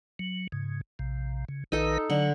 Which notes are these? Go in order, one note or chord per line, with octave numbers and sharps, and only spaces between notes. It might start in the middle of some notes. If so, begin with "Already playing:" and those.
F#3
G#2 C#3
A#1 C3
C#3
A#1 D#3 D#4 A4 B4
D3 F#3